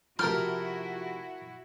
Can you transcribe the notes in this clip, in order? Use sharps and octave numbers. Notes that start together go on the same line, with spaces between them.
C3 F3 E4 F#4 A#4 G5 A5 F6